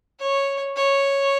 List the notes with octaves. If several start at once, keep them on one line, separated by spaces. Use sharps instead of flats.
C#5
C#5